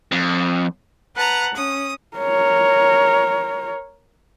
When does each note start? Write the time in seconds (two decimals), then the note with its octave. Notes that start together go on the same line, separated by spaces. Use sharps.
0.12 F2
1.15 B4 F#5 A5 A#5
1.53 C#4 D#6
2.17 A#4 C#5